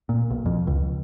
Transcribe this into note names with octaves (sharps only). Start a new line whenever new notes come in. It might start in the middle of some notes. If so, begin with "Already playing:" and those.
A#2
B1
F2
C#2